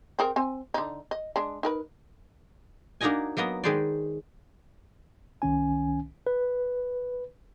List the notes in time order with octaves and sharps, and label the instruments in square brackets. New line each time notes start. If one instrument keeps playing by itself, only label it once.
[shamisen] C4 G#4 A#4
C4 G#5
D3 D#4
D#5
G#3 D4
D#4 A#4 B4
[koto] A#3 D4 D#4 F#4 D#5 G#5
F#3 A#3 B3 D#5
D#3 G#3 G#4 B4 C5 D5
[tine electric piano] C2 D#3 C#4 G#5
B4